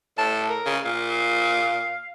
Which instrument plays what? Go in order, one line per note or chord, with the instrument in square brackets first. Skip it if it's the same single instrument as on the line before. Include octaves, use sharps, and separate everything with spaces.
[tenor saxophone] A2 [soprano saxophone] A5
[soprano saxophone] A#4
[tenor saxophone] C#3
[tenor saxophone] A#2 [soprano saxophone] F5